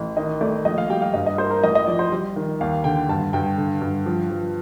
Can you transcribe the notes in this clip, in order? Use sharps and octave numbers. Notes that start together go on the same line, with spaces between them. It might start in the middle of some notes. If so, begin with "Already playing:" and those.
Already playing: A1
D#3 D#5
A3 D5
A#1 D#5
F5
G3 G5
F5
G2 D#5
D#5
A#3 C5
A#4
A1 D#5
D#5
F3 D5
C5
G3
D#3
D#2 F5
D3 G5
G2 A5
G2 G5
D3
G2
F3
F3